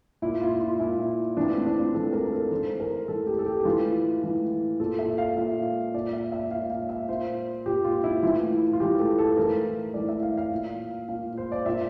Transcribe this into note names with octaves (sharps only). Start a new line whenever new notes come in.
A#2 E4
F4
F4
A#2 E4
A2 E3 D4
C4
D4
F4
A2 E3 A4
A#4
A#4
A4
A2 E3 C5
A#4
A2 E3 A4
G4
A4
G4
G4
A2 E3 F4
A2 E3
A#2 A4
E5
F5
A#2 E5
A#2 D5
E5
E5
A#2 F5
F5
E5
A#2 C5
A#2 G4
F4
E4
A2 E3 F4
F4
A2 E3 G4
A4
A4
A2 E3 A#4
A2 E3 D5
E5
F5
F5
A#2
A#2 F5
C5
D5
A#2 E5